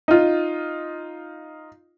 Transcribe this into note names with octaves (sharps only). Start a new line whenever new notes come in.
D#4 F4